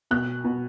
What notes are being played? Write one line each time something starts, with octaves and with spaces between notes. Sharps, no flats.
B2 F#6
B2